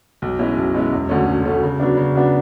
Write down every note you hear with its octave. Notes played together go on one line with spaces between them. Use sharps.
B1
B2 G#3 C#4 E4
B1
B2 G#3 C#4 E4
E1
D2 D3 A3 C#4
E1
D2 D3 A3 C#4
C#3
F#3 B3 D4
C#3
F#3 B3 D4